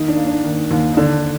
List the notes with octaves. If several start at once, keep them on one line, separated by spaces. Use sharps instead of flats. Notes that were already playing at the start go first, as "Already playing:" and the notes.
Already playing: D#3 A#3 D#4
D4
A#3
D4
D#3
D#2
D#4
D3 D4